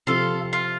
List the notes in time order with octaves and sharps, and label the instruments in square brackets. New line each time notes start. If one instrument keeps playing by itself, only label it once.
[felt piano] C3 F3 C4 [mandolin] F4 A4
[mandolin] F4